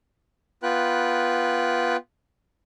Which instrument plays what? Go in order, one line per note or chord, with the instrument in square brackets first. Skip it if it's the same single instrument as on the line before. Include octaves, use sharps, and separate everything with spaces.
[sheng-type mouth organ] B3 F4 B4 G5 F#6